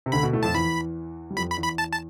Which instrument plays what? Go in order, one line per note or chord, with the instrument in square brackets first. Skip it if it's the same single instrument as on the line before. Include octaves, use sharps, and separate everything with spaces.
[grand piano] C3
[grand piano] D2 D3 [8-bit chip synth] B5
[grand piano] B2
A2 A3
[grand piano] F2 F3 [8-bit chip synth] A5
[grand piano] E2 E3 [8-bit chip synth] B5
[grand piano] G3
[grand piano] F2 F3 [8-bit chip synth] B5
[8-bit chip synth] B5
[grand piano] E2 E3
[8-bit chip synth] B5
A5
A5